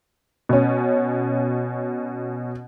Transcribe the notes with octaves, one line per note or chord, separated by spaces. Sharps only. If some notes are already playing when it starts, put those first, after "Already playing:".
B2 C#4